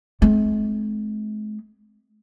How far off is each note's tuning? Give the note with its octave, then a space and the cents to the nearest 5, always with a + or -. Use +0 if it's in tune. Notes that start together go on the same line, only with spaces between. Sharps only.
G#3 +45 C4 +0